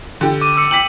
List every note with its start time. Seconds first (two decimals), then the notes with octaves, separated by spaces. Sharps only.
0.21 D3 G4
0.41 D6 D#7
0.56 D6 E6 C#7
0.71 G5 D6 B6 F#7